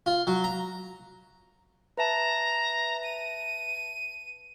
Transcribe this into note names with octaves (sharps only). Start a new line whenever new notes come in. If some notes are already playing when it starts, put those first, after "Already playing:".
F4
F#3
A#5
B4 E5 A5 A#5
D#7